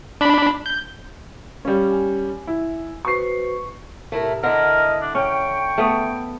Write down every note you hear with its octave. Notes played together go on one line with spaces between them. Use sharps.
D4 B5
G6
G3 C#4 F5
G#5
E4
F#4 B4 C5 C#6 C7
A2 C3 A3 E4 A#4
D3 E4 A#4 D#5
D4
C#4 G5 C#6
A3 B3